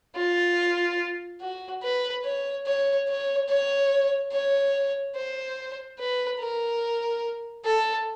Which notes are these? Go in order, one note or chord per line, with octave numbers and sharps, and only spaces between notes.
F4
F#4
B4
C#5
C#5
C#5
C#5
C#5
C5
B4
A#4
A4